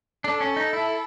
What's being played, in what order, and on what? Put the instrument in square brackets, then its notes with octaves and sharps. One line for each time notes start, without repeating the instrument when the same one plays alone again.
[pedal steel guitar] D4 [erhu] A4
[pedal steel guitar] C#4
D#4
E4